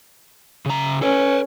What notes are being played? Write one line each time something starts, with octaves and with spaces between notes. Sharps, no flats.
C#3 A#5
C#4 A4 B4